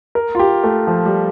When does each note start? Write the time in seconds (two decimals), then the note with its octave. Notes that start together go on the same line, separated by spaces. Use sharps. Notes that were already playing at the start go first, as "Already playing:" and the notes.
0.15 A#4
0.35 F4
0.39 G4
0.64 A3
0.87 F3
1.05 G3